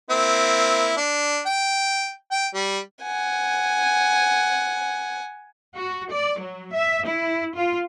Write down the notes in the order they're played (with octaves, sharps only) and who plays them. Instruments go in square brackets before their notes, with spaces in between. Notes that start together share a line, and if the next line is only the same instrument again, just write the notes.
[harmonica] A#3 C4 E4
D4
G5
G5
G3
[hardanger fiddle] F#5 G#5
[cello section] F#4
D5
F#3
E5
E4
F4